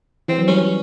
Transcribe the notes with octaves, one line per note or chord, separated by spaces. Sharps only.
E3 C4
F#3
G3 C#4
G3